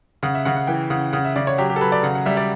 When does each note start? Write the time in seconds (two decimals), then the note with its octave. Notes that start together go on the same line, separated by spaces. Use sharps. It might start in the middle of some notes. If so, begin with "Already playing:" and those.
0.23 C#3 F#5
0.35 E5
0.45 C#3 F#5
0.56 F#5
0.67 E3 G5
0.90 C#3 F#5
1.13 C#3 F#5
1.25 E5
1.36 C#3 D5
1.47 C#5
1.58 F#3 G4
1.70 G4
1.76 A4
1.81 F#3 B4
1.92 D5
2.03 C#3 F#5
2.15 F#5
2.26 G3 E5
2.37 D5